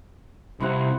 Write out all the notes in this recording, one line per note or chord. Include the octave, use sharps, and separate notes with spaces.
C2 C3 E4 F4 F#5